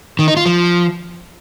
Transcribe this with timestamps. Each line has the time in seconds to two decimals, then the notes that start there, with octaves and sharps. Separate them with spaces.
0.19 D#3
0.28 D#4
0.37 F4
0.46 F3